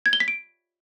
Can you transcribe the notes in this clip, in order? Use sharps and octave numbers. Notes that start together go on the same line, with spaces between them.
G#6
G7
B6
D7